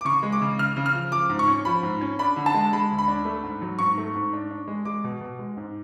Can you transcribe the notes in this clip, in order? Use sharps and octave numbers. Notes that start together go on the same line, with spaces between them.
D6
C#3 C#6
G#3
D6
C#3
C#3 F6
C#3
F6
F3
F3 D6
G#2
C#6
C#4
F3 B5
G#2
C#4
D4 B5
D3
A5
G#3
G#3 B5
D2
B5
D4
A3
G#2
F#3
G#2 C#6
A3
G#2
D4
D4
G#3
G#3 D6
B2
B2
G#3
G#2